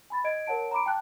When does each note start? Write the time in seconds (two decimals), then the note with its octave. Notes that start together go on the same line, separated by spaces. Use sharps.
0.10 G#5 B5 A6
0.24 D#5 G#6 D7
0.47 A#4 C#5 F#5 A5 D7
0.71 A#5 B5 D6 D7
0.86 G5 A5 F#6